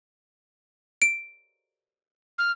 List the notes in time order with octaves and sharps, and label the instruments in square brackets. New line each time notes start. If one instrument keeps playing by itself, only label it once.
[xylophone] D7
[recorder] F6